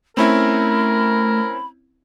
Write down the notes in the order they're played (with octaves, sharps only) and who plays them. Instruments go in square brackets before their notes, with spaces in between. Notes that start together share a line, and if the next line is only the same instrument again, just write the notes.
[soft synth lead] A3 [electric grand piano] C4 C#4 E4 [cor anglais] A#4 [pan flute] B5